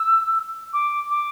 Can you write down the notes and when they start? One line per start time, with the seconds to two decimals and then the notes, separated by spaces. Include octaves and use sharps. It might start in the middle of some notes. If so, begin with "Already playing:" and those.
Already playing: E6
0.73 D6
1.10 D6